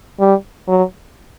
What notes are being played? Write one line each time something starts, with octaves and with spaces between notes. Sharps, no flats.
G3
F#3